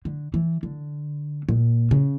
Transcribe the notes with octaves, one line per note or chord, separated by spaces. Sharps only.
D3
E3
D3
A#2
C#3